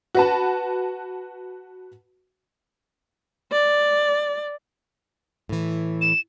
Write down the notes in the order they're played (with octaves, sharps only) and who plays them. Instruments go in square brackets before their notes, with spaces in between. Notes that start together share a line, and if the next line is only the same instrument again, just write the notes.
[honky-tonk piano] F#4 B4 A5
[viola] D5
[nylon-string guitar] A2 E3
[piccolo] E7